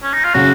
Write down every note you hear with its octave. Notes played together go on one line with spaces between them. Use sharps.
C#4
D#4
F4
C#3 F#3 C#4 F#4